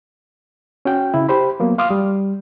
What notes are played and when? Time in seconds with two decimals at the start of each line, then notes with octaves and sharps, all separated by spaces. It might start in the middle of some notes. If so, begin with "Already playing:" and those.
0.85 C#4 F#4 G5
1.14 C#3 E4
1.29 G4 C5 B5
1.60 F#3 A#3 B3
1.78 F5 C6 D6 D#6 F6
1.90 G3